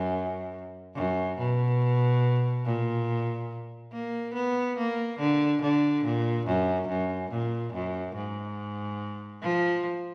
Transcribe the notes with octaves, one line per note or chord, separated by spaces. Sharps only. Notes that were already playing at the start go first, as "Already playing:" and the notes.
Already playing: F#2
F#2
B2
A#2
A#3
B3
A#3
D3
D3
A#2
F#2
F#2
A#2
F#2
G#2
F3